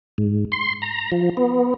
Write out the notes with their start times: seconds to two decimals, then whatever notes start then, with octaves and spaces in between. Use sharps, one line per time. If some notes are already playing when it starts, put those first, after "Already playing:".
0.18 G#2
0.52 C6
0.82 A#5
1.12 F3
1.37 B3